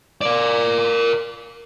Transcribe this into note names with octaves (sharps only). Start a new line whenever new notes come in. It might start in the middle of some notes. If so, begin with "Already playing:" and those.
A#4 D5